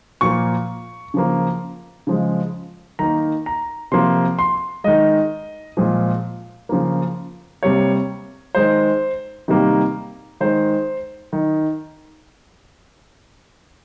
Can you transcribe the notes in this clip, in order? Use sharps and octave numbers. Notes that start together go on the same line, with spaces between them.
A#2 F3 A#3 C#6
C#3 F3 A#3
C#3 F3 G#3
D#3 A#3 A#5
A#5
C3 F3 A#3 C6
C6
D#3 G#3 D#5
A#2 F3 G#3
C#3 F3 A#3
C3 G3 A#3 C#5
D#3 G#3 C5
C3 D#3 G3 A#3
D#3 G#3 C5
D#3